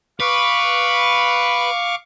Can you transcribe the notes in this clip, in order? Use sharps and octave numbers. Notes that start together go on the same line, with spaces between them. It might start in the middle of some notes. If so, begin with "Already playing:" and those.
B4 F5 C#6 D6